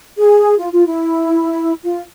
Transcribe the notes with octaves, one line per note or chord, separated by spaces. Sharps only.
G#4
F4
F4
E4
F4